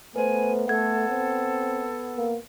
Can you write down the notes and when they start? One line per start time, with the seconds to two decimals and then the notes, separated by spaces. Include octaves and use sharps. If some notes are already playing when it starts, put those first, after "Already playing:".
0.16 A3 B3 B4 C5 G#5
0.68 A3 A4 F#5 G#6
1.10 C4
2.17 A#3